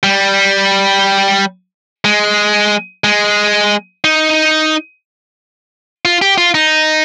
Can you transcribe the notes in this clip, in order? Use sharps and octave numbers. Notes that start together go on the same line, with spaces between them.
G3
G#3
G#3
D#4
F4
G4
F4
D#4